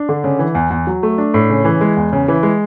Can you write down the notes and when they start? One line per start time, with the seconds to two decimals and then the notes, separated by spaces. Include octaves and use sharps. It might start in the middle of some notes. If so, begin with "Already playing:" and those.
Already playing: D4
0.09 D3
0.24 C#3
0.39 E3
0.55 E2
0.70 E2
0.87 F#3
1.03 A3
1.18 D4
1.34 A2
1.50 C#3
1.65 E3
1.81 G#3
1.97 E2
2.13 C#3
2.28 E3
2.43 G#3